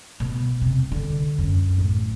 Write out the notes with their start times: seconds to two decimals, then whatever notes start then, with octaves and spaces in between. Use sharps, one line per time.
0.20 B2
0.62 C3
0.92 D3
1.38 F#2
1.78 A1